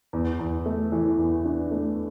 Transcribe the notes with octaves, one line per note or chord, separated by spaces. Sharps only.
E2
E2
A3
E3
E2
D4
A3